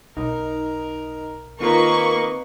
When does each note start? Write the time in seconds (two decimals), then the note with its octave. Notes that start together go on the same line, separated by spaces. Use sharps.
0.17 B1 D#4 A#4
1.60 D#3 A#3 C4 F4 B4 D#5 C#6